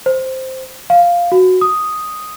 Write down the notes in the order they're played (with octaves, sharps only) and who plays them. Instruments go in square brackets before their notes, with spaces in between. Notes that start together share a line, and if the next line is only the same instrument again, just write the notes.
[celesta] C5
F5
F#4
D#6